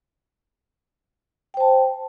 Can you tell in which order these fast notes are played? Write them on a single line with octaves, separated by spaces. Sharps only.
G5 C5 A5